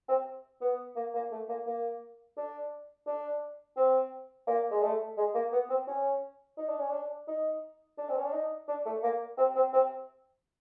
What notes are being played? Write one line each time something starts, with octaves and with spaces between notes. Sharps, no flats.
C4
B3
A#3
A#3
A3
A#3
A#3
D4
D4
C4
A#3
G#3
A3
G#3
A#3
B3
C4
C#4
D#4
D4
C#4
D4
D#4
D4
C4
C#4
D4
D#4
D4
A3
A#3
C4
C4
C4